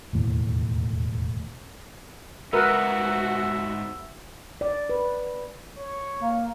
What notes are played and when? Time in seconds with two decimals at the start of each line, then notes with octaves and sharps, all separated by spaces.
0.13 E1 D#2 A2
2.53 G#2 B3 F#4 A#4 B4 E5
4.61 D5
4.90 B4
5.79 C#5
6.21 A#3